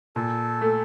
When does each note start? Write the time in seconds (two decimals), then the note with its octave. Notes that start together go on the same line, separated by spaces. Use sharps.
0.16 A#2 A4
0.61 A3